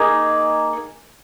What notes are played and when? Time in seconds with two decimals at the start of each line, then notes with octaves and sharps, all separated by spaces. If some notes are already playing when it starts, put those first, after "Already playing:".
Already playing: A#3 D#4 G#4